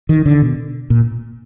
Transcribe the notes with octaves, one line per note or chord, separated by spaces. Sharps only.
D#3
D3
B2
A#2